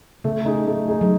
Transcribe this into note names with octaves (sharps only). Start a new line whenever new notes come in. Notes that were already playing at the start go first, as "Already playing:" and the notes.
C#3 A3
D#4 G#4
A3
D#4 G#4
F#3